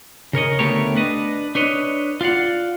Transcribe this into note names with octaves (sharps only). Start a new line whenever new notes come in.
C#3 A#4 C#5 D#5
D2 A3 B3 G4 A#4 C#5
D4 B4 D#5
D4 B4 C#5 D#5
F4 D5 F5 F#5